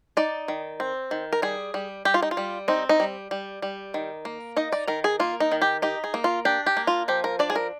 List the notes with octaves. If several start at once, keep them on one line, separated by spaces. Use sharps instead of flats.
D#4 D5
D#3
C4
D#3
A#4
G3 G#4
G3
G3 G4
F4
D#4
F4
G3
C4 D#4
D#4
G3
G3
G3
D#3
A#3
D#4 D#5
D5
D#3 A#4
G#4
A#3 F4
D#4
D#3
G4
D#4 G4
G#4
A#3
F4
D4 G4
G4
A#3
F4
F3 G4
A#4
D4 D5
G#4
A#4